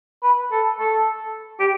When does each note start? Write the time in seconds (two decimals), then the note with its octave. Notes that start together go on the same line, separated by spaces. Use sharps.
0.23 B4
0.51 A4
0.80 A4
1.60 G4